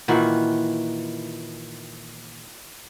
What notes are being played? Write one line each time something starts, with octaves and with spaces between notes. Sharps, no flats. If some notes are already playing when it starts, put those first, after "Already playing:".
A#2 D#3 E3 F#4